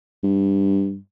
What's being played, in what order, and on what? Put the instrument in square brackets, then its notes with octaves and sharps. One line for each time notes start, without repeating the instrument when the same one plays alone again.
[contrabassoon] G2